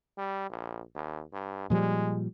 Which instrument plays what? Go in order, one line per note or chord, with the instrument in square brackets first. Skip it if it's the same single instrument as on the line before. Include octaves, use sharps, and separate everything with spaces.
[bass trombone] G3
A#1
D#2
G2
[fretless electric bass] A#2 F3 G3 [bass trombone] G#3